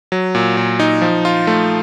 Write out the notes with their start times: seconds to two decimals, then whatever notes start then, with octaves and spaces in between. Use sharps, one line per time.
0.12 F#3
0.35 A#2
0.57 A#2
0.80 D#4
1.02 F3
1.25 F4
1.47 A3